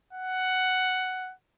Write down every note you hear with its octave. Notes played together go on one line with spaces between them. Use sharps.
F#5